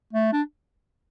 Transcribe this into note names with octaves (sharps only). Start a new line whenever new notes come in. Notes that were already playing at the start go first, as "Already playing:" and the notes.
A3
D4